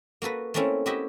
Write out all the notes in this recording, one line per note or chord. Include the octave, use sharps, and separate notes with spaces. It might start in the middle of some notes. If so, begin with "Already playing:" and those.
A#3 F#4 A4 B4
A3 A#3 C4 C#4 E4 A4
E4 F#4 G4 D#5 E5